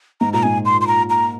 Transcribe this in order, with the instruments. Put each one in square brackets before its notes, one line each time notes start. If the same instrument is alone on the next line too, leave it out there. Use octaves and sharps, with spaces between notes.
[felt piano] G#2 [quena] A#5
[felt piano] A#2 [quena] A#5
[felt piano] G#2 [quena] G#5
[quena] C6
C6
A#5
A#5